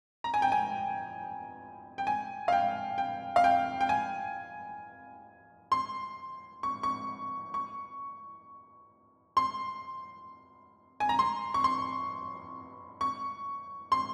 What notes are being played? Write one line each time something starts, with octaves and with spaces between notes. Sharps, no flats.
A#5
G#5
G5
G#5
G5
G#5
F5
G5
G5
F5
G5
G5
G#5
C6
C#6
C#6
C#6
C6
G#5
A#5
C6
C#6
C6
C#6
C6